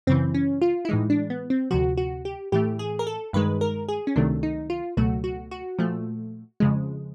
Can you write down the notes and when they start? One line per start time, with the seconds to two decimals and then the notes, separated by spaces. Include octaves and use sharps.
0.07 F#2 C#3 E3 C4
0.34 C#4
0.62 F4
0.85 E4
0.89 A2 E3 G#3 D#4
1.10 D4
1.30 B3
1.50 C4
1.71 D2 C3 F3 F#4
1.97 F#4
2.25 G4
2.52 A2 E3 A3 G4
2.79 G#4
2.99 A#4
3.07 A4
3.33 G2 D#3 G#3 B4
3.61 A#4
3.89 G#4
4.07 C#4
4.16 C#2 C3 D#3 F#3 A3 D4
4.43 D#4
4.70 F4
4.97 C#2 B2 F#3 A3 F#4
5.24 F#4
5.51 F#4
5.78 A#2 F3 A3
6.60 F2 C#3 F3 G#3